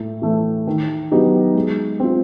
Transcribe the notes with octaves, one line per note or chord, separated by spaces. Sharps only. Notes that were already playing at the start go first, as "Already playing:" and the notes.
Already playing: A2
E3 A3
D#3
F#3 B3 D#4 G4
G#3
C4 F4